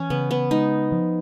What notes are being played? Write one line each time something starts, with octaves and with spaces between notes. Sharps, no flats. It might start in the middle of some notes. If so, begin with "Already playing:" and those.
Already playing: E3 C#4
C#3 B3
B3
G#3 D#4
F3